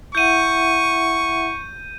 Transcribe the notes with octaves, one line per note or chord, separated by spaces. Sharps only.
E4 E5 F#5 C#6 G6 D#7